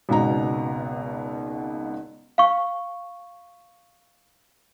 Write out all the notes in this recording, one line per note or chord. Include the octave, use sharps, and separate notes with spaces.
G#1 C#2 B2 A#5
F5 C#6